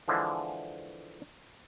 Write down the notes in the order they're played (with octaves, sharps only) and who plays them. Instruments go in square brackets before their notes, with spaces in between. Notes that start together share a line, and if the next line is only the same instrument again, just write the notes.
[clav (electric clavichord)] D3 E3 F3 G#3